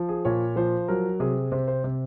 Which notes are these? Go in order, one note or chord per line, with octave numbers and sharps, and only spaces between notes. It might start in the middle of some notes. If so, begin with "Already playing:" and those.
Already playing: F3
G#4
A#2 C#5
F3 C5
F#3 A#4
C3 G#4
C3 C5
C5
C3